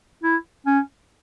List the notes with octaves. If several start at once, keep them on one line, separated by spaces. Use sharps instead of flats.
E4
C#4